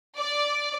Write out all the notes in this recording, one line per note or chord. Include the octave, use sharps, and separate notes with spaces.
D5